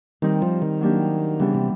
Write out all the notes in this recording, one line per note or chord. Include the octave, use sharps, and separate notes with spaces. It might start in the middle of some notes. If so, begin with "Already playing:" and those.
D#3 G3 C4 D#4
F3
D#3
F#3 A#3 D4 G4
C#3 E3 G3 B3 D4
C3